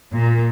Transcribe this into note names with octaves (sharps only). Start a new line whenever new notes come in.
A#2